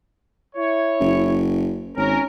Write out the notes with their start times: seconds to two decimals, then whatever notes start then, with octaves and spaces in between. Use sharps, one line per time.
0.55 E4 C#5
1.00 F#1
1.97 G#1 C#4 A#4